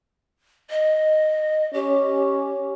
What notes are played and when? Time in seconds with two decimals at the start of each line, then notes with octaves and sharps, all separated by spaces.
0.70 D#5
1.74 C#4 G4